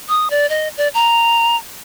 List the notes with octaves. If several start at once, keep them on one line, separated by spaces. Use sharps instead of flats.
D#6
D5
D#5
D5
A#5